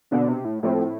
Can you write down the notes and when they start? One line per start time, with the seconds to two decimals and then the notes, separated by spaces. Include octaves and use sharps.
0.11 B2 D3 B3 D4
0.29 C3
0.45 A2
0.62 A2 F3 A3 C4